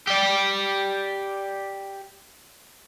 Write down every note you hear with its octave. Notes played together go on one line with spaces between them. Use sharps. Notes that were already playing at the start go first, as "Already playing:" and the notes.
G4 D5